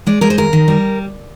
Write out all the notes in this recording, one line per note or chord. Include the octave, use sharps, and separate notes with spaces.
G#3 D5
G#3 A#4
C5
D#2 A#4
D#3
G3